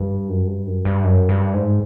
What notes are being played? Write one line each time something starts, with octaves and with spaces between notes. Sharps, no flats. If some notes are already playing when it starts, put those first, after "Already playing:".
Already playing: G2
F#2
G2
F#2
G2
F#2
G2
G#2